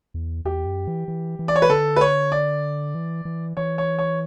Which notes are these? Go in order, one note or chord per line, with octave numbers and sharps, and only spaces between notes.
E2
E2 G4
F#2
E3
E3
E3
D5
C#5
B4
D3 A4
B4
C#5
D5
E3
E3
E3 C#5
C#5
C#5